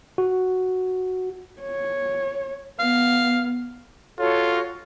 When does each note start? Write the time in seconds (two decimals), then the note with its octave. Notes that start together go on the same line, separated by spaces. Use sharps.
0.18 F#4
1.61 C#5
2.79 B3 F5
4.19 F4 F#4 A4 C#5